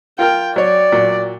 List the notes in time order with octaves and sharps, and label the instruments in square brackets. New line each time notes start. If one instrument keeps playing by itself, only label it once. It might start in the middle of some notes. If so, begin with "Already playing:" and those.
[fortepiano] F4 A#4 F6 [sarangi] G5
[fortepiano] F#3 C#5 [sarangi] D5
[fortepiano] A#2 F#3